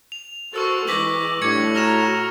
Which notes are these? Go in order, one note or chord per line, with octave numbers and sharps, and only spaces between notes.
F7
F#4 A4 A#4 C5 C#6 E6 A6
E3 G#3 D6 A#6 B6 F#7
A2 G3 D4 C#6 G#6 C#7
F#4 A#5 F6 A#6 E7